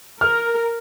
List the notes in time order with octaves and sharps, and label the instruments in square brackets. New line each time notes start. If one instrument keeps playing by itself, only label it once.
[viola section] A#4 [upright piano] F6